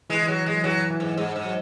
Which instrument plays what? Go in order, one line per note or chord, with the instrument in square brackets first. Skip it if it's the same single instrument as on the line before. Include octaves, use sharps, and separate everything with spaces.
[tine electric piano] E3 [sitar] G#3
[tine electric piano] E3
[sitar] F#3
[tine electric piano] F#3 [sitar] G#3
[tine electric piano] E3 [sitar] F#3
[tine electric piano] E3
[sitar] G#2
[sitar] G#2 [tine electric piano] G#3
[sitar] G#2
[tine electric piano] F#3